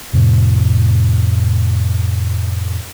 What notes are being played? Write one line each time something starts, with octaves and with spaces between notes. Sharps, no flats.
F2 A2 C3